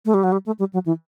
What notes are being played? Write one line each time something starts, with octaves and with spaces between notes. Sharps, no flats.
A3
G3
F#3
G3
A3
G3
F#3
E3